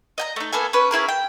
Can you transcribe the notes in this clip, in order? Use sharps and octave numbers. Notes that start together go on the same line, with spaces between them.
D#5 G5 A#5
A3 D#4
A#3 B3 A4 G#5
C#4 B4
C#4 E4 G#4 A#4
G5